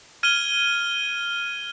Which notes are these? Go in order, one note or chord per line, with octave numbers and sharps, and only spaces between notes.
F6 G#6 D#7 G7